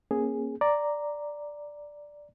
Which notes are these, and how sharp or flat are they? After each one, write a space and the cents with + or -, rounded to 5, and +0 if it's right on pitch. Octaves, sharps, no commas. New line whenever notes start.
A#3 +10 C#4 -30 G#4 +0
D5 +0 A#5 +0